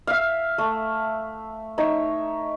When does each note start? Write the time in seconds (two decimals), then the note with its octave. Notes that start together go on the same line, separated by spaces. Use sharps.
0.07 E5 F5
0.58 A3
1.78 D#4 C#5 E5